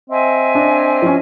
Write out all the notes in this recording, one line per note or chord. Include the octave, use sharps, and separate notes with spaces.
C4 D#5 E5 G#5
D4
F3 C#4